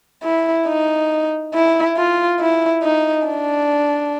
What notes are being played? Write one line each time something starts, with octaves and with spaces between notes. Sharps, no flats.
E4
D#4
E4
F4
E4
D#4
D4